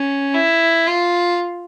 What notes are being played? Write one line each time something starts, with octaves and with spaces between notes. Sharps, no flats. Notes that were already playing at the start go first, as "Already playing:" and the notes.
Already playing: C#4
E4
F4